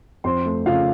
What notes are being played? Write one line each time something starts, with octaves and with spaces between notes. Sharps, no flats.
F2 C5 C6
A3
C#3 F4 F5